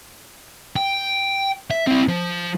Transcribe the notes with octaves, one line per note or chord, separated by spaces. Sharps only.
G5
E5
C4 E4
F3